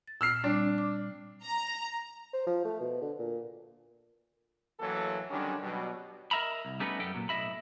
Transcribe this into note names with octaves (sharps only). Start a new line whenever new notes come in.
A6
A#2 E6 F6 C7
G3 C4 D4 D6
D6
A#5
C5
F3
A3
B2
D3
A#2
A1 E3 F#3 A#3 A4
D3 D#3 F#3 G3 C#4 D4
B2 F#3 G3
A#4 D#5 E5 A#5 B5
C2
G3 A3 B3 C#4 D#4 B4
F#2 G3 B3 A4 G5
A#2 F#3
B1 A2 C#4 D#5 E5 B5